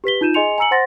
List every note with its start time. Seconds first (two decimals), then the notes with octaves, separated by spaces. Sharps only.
0.04 G4 B4 B6 G7
0.21 D#4 F4 G6 D#7 E7
0.34 G#4 D#5 G#5 C6 C#7 F7
0.58 G#5 A#5 E6 C#7 F#7
0.71 C5 F#5 C6 A6 A#6